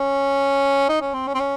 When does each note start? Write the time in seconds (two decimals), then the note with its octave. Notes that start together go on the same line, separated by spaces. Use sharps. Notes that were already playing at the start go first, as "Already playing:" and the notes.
Already playing: C#4
0.89 D#4
1.02 C#4
1.14 C4
1.28 C#4
1.35 C4
1.40 C#4